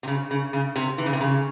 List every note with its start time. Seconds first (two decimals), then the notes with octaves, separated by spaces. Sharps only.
0.03 C3
0.08 C#3
0.31 C#3
0.53 C#3
0.76 C3
0.98 E3
1.06 C#3
1.13 C3
1.21 C#3